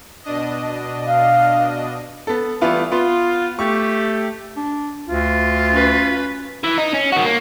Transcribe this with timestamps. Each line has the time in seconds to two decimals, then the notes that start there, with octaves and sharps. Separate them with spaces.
0.24 B2 D4 D#5
1.07 F5
2.27 B3 A4
2.61 E3 G3 A3 B3 E4 F4
2.92 B3 F4
3.59 A3 G4 C#6
4.57 D4
5.08 D2 F4
5.72 C#4 B4
6.64 E3
6.78 D#4
6.94 C#4
7.12 D#3 F#4
7.25 A#3